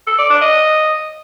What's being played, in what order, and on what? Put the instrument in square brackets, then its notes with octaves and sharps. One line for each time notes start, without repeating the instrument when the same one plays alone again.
[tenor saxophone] A4
D5
D4
D#5